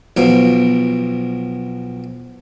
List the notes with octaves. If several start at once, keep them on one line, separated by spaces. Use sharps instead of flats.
B1 B2 F3